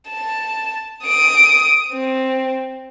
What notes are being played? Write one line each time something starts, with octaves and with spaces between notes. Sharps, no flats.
A5
D#6 D7
C4